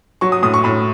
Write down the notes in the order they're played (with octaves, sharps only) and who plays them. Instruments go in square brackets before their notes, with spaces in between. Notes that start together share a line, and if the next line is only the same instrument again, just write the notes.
[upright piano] F#3 C#6
D#6
A2 D#6
C#6
A2 B5